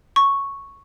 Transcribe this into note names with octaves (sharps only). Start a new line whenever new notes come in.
C#6